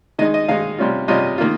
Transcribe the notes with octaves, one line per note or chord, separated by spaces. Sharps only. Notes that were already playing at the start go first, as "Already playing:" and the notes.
D#3 G#3 D#4 D#5
D#5
D#3 G#3 D#4 F5
C3 G3 C#4 F4
C3 G3 C#4 F4 D#5
D#3 A#3 F4